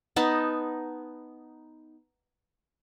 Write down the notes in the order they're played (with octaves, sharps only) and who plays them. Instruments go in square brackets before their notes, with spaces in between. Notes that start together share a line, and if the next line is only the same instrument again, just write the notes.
[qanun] B3 D#4 A5 B5